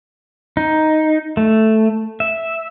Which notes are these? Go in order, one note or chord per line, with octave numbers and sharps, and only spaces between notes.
D#4
A3
E5